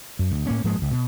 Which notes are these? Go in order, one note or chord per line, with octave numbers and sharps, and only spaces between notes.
F#2
D2
A2 A#3 C#4
G#2 F3 G#3 A#3
D1 C#2
B2